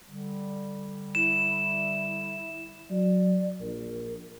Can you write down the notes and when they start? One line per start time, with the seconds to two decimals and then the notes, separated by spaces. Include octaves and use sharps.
0.07 D3 G3
1.15 E4 E7
2.90 F#3 D5
3.61 A#1 A#4